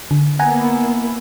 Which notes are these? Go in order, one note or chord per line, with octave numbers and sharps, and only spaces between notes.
D3
A#3 B3 E4 F#5 G#5 A#5